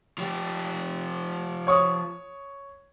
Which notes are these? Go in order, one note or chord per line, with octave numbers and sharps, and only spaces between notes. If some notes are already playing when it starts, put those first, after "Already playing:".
F3 G4
C#5 C#6 D#6